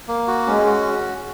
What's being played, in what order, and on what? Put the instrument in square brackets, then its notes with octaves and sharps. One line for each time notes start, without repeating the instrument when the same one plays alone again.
[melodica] A#3
F#4
[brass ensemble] G#3 [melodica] C#4
[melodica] F#4